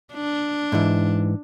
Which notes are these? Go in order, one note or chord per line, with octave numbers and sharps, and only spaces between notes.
D4
G#2 E3